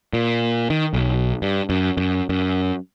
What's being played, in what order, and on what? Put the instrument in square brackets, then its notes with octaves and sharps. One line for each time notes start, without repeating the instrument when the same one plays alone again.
[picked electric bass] A#2
D#3
B1
G2
F#2
F#2
F#2